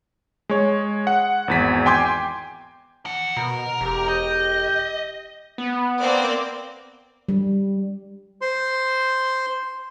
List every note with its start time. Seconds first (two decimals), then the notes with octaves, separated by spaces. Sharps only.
0.49 G#3 C#5
1.07 F#5
1.48 G#1 E2 B6
1.86 G5 G#5 C6 D6 G6 G#6
3.05 E4 F#5
3.37 B2 A#4
3.81 E1 G4
4.08 G4 D#5 G5
5.58 B3
6.01 A#3 C4 D5
7.29 G3
8.41 C5 C6